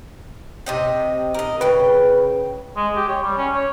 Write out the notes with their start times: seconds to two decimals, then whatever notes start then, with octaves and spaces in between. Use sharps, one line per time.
0.66 C3 D#5 G5
1.34 A#4 D#5
1.61 C#3 B4 G5
2.77 G#3
2.96 G4
3.09 C#5
3.23 G3
3.37 C#4
3.54 C#5